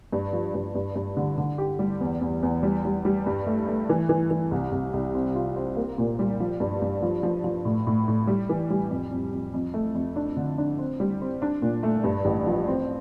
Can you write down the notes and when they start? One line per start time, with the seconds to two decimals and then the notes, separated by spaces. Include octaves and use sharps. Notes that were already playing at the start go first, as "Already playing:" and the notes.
0.13 G2
0.33 F3
0.55 G2
0.75 G2
0.95 G2
1.17 D3
1.38 D3
1.58 G4
1.79 G3
2.01 E2
2.21 E2
2.43 E2
2.63 G3
2.85 G3
3.05 G3
3.26 G2
3.46 A3
3.68 A3
3.89 E3
4.09 E3
4.30 E3
4.51 C2
4.72 C2
4.93 C2
5.14 C4
5.35 F4
5.56 C4
5.77 A#3
5.98 A#2
6.19 G3
6.40 F3
6.60 G2
6.82 G2
7.02 F3
7.23 F3
7.44 F3
7.65 A2
7.87 A2
8.08 A2
8.27 G3
8.49 E3
8.70 G3
8.90 F2
9.11 F2
9.32 F2
9.54 F2
9.74 A3
9.95 F2
10.16 D4
10.37 D3
10.58 D4
10.78 C4
11.00 G3
11.21 C4
11.42 D4
11.62 A#2
11.83 A3
12.04 G2
12.25 A1
12.47 F3
12.68 C4